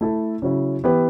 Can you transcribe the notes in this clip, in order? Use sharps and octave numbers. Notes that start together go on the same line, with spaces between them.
A3 E4 A4
C#3 F#3 C#4 E4
E3 B3 E4 G4 B4